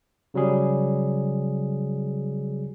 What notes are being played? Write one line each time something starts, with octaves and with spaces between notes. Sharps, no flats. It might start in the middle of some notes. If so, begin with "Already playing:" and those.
C#3 F#3 G3 G#4